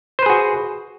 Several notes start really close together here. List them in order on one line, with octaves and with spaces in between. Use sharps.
C5 B4 G#4 F#4